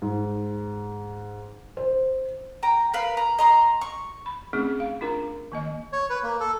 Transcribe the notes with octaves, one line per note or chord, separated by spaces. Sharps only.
G#2
C5
G5 A#5
A#4 B4 F5
A#5
D#5 A#5 C6
C#6
B5
A3 C4 C#4 D#4 G#4
F5
D4 F4 A#4 A#5
D#3 A#3 D#5
C#5
B4
A#3
A4